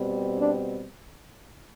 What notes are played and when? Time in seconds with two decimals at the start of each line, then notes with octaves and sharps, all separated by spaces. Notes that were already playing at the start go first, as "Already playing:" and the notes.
Already playing: B2 G3 C4
0.39 D4